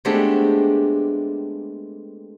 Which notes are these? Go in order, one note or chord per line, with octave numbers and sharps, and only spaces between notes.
G#3 A3 B3 C4 D4 G4